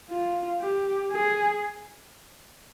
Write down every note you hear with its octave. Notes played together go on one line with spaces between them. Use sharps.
F4
G4
G#4